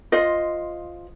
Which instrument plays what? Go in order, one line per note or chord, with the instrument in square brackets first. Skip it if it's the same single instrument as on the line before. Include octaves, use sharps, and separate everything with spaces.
[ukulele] F4 C5 D#5